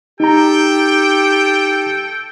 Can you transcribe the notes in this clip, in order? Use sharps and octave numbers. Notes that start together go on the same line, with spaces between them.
D#4 G4 A4 G5 A#5